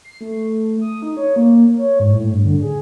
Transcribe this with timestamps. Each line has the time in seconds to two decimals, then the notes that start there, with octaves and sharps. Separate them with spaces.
0.04 C7
0.21 A3
0.82 D#6
1.02 D#4
1.17 C#5
1.36 A#3
1.77 C#5
2.00 G#2
2.12 A2
2.31 G2
2.45 D3
2.62 G#4